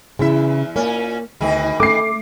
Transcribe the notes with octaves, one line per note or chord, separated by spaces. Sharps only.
E2 C#3 E4 E5
A#2 A#3 C#4
D2 B2 D#3 G#4
A3 D6 C7